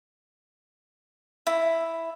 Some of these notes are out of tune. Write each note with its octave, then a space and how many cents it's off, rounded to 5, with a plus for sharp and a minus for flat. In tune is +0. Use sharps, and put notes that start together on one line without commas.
E4 +0